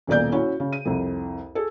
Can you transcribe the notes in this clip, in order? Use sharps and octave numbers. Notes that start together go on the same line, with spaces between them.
D#1 B1 A#2 D5 G6
C#4 E4 F#4
C#3
D#7
C2 F2
G#4 A4